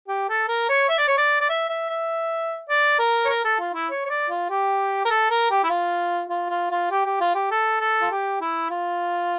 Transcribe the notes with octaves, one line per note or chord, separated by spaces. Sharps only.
G4
A4
A#4
C#5
E5
D5
C#5
D5
D5
E5
E5
E5
D5
A#4
C#5
A#4
A4
F4
E4
C#5
C#5
D5
F4
G4
A#4
A4
A#4
G4
E4
F4
F4
F4
F4
G4
G4
F4
G4
A4
A4
F4
G4
E4
F4